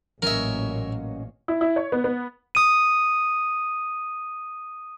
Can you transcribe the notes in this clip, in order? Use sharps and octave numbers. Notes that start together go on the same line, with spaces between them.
A1 A#2 F#3 A#3 C#4 A#4 D#5 E5
E4
E4
C#5
B3
B3
D#6 D#7